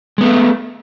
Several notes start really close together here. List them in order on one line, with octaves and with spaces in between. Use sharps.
G#3 B3 A3